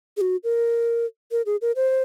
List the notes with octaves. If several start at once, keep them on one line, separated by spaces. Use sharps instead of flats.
G#4
F#4
A#4
A#4
G#4
A#4
C5